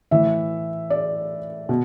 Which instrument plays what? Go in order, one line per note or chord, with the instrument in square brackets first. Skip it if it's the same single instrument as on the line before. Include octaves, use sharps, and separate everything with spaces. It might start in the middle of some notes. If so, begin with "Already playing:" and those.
[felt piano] A2 E3 E5
D5
B2